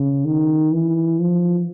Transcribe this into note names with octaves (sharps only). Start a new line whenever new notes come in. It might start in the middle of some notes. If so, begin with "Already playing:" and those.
Already playing: C#3
D#3
E3
F3